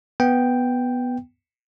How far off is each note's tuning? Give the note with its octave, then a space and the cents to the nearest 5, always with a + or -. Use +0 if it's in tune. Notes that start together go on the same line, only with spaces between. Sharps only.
B3 +0 G5 +0